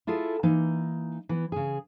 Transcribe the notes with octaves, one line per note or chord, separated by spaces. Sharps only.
E4 F4 G#4 A4
E3 A#3 D#4
E3 B3
C#3 G#4